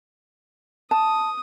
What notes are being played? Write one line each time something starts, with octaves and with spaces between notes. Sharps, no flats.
A5 D#6